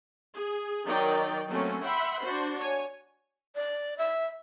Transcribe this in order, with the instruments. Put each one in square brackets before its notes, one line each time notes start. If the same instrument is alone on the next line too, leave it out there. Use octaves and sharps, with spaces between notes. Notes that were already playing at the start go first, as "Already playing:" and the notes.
[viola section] G#4
D#3 F#3 D#4 D5 G5
F#3 A3 A#3 C4 C#4
E5 F#5 G5 B5 C6
D4 F#4 C5
C#5 G#5
[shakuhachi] D5
E5